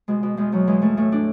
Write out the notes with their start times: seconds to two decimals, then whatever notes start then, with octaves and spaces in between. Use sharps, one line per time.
0.08 B2 G#3
0.23 B2
0.37 E2 G#3
0.52 E2 F#3
0.67 E3 G#3
0.81 E3 A3
0.97 A2 A3
1.12 A2 D4